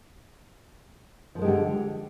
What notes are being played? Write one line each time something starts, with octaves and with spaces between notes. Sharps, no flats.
D3 F3 G#3 A#3 G4